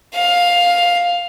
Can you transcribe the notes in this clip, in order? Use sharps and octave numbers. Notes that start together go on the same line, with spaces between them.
F5